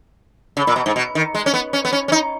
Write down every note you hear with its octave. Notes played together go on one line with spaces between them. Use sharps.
C#3
A#2
B2
G#2
B2
D#3
G#3
C#4
B3
C#4
B3
C#4
C#4
D#4